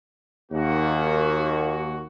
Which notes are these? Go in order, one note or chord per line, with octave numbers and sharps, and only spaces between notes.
D#2 A#3 F#4